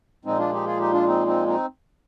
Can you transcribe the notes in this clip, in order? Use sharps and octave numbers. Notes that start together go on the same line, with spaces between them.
A#2 F3 G#3 C4 D#4
D4 F4
D#4 G4
F4 G#4
D#4 G4
D4 F4
C4 D#4
C4 D#4
C4 D#4